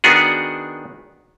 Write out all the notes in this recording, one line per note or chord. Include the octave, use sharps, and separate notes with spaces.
D#3 B3 D4 F#4 G#4